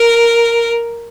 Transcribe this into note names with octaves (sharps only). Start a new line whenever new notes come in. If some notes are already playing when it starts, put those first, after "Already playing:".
Already playing: A#4